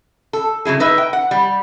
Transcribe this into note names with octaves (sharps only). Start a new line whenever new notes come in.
A4
C#3 F#3 E4 G#4
D#4 B4 E5
G5
F#5
G3